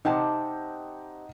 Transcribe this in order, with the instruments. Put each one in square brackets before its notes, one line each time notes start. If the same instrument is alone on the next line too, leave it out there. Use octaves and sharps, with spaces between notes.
[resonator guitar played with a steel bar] C3 C5 A5 [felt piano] D#4 F#5 G5